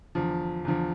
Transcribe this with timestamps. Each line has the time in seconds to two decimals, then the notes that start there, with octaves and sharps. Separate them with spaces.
0.15 E2 D3 F3
0.65 E2 D3 F3